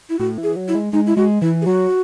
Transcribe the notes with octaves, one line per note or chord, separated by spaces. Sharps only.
E4
A2 F#4
E3
G#4
F#3
E4
G#3
G#3 D#4
E4
G#3 F#4
E3 E4
G#4
F#3 F#4